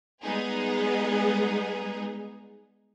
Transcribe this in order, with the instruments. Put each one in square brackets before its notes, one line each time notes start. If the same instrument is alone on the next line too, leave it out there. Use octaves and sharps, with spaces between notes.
[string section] G3 G#3 B3 D#4 G#4